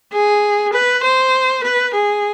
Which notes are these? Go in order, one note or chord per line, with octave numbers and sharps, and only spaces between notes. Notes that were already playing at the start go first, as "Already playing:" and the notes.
G#4
B4
C5
B4
G#4